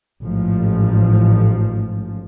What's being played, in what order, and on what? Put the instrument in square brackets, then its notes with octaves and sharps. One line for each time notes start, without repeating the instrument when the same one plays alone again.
[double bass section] A1 G#2 F3